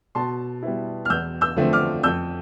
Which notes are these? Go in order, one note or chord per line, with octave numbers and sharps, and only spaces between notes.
B2 A5 C6
G3 B3 E4
F6
E2 E6 G6
E6 G6
D3 F3 A3 C4
D6 F6
F2 E6 G6